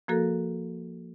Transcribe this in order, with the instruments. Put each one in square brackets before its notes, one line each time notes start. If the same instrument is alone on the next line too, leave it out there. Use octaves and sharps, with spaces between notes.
[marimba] F3 A#3 F#4 A4 A#4